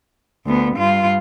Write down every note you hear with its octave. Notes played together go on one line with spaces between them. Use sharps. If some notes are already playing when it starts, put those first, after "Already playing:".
D2 B3
G2 F4